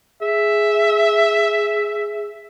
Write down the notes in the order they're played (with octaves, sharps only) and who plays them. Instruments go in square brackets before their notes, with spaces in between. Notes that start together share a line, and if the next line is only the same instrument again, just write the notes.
[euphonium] G#4 [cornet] E5